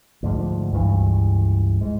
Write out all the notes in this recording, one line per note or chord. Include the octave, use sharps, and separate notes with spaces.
D2 G#2 F3
C#2 G2 E3
G#2